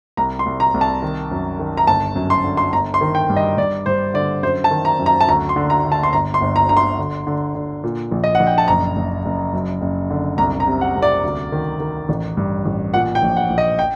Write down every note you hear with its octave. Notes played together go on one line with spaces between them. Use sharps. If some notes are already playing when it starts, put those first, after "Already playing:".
C2 A#5
C6
C2
A#5
C2
A5
D#3
F#2
D#3
A#5
G1 A5
F#2
C6
D3
C6
G1 A#5
C6
D#3
G5
G2
D#5
G2 D5
G2 C5
D3 D5
F#2 C5
A5
D#3
A#5
F#2
A#5
A5
D2 A#5
C6
D3
A#5
D3
A5
C6
G1 A#5
C6
G1
A#5
D3 A#5
C6
D3
D3
D3
A#2
A#1
D#5
F#5
A#1
G5
A5
F#1 A#5
F#1
F#1
F#2
F#1
D3
C2 A#5
A#5
C3
F#5
C2
D5
D2
D#3
D#3
A1
G2
A1
A#2 F#5
G5
A#1
F#5
A#1
D#5
G5